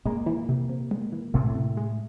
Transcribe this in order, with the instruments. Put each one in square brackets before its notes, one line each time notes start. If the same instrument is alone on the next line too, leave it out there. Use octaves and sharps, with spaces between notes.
[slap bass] A#2 A#3 [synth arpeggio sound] G#3
[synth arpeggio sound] E3
C3
C3
G#3
E3
[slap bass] A2 A3 [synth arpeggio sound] C3
[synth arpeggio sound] C3
G#3